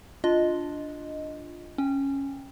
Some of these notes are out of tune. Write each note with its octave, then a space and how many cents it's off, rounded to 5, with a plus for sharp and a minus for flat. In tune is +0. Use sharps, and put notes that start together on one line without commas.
D4 +0 F4 +0 D#5 +0
C#4 -10 G5 +10